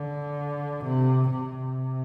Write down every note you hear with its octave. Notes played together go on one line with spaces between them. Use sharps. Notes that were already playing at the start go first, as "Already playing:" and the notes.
Already playing: D3
C3
C3